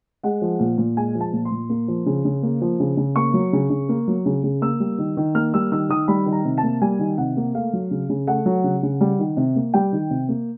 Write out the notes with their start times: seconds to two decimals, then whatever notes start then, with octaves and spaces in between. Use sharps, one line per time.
0.23 G#3 F#5
0.42 F3
0.60 A#2
0.78 A#2
0.97 G#3 G#5
1.15 F3
1.20 A5
1.33 A#2
1.45 C6
1.51 A#2
1.70 A#3
1.88 F3
2.06 C#3
2.25 C#3
2.43 A#3
2.61 F3
2.80 C#3
2.97 C#3
3.16 A#3 C#6
3.34 F#3
3.53 C#3
3.70 C#3
3.89 A#3
4.08 F#3
4.26 C#3
4.44 C#3
4.62 A#3 E6
4.80 G3
4.98 D#3
5.17 D#3
5.35 A#3 F6
5.54 G3 E6
5.72 D#3 E6
5.89 D#3 D#6
6.08 G3 B5
6.26 D#3
6.32 A#5
6.45 C3
6.58 A5
6.63 A#3
6.81 G3 G#5
6.99 D#3
7.18 C3 F#5
7.37 A#3
7.55 A3 F5
7.73 F#3
7.91 C#3
8.09 C#3
8.27 A3 F#5
8.46 F#3
8.64 C#3
8.83 C#3
9.01 G3
9.19 D#3
9.37 C3
9.56 A#3
9.74 G3 G5
9.92 D#3
10.10 C3
10.29 A#3